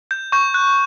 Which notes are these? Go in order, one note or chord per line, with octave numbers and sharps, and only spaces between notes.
G6
C#6 G6
F#6